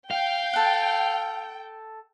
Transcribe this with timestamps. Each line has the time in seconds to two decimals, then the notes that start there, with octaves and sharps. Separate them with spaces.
0.11 F5 G5
0.53 A4 F#5